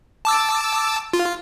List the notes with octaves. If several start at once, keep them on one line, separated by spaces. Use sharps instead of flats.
A5 D6 E6
F4